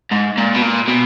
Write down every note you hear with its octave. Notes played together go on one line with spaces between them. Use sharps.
G#2
A#2
B2
A#2
B2